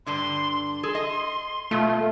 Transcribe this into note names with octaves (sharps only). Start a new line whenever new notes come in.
G2 D3 D4 C6
C6
G#4 A4
D#5
B2 A3 F4